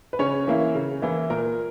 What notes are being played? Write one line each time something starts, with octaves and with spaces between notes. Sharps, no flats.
B4
C#3 C#4 C#5
E3 A#3 E4
C#3
E3 A#3 E4
A#2 A#4